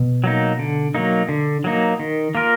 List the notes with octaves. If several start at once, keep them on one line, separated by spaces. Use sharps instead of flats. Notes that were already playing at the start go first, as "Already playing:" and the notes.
Already playing: B2
F#3 A#3 D#4
D3
F#3 A#3 D#4
D3
F#3 A#3 D#4
D#3
A#3 F4 A#4